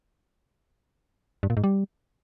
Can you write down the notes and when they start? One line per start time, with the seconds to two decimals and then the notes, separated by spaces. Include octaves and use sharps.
1.43 G2
1.50 A#2
1.57 G#2
1.64 G3